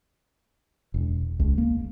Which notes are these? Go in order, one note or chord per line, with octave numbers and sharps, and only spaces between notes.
E1
C#2
A#3